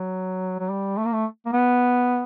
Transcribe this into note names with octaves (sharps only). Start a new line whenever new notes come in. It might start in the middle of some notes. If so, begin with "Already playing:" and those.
Already playing: F#3
F#3
G3
A3
A#3
A3
A#3
B3